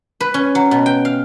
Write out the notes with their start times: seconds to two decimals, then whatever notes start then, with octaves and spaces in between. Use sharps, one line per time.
0.20 B4
0.34 C#4
0.55 F#3
0.71 B2
0.86 G5
1.05 F5